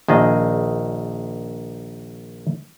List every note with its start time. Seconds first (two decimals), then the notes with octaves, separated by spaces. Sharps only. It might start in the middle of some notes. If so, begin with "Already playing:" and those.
0.08 A#1 D#3 G#4 D#5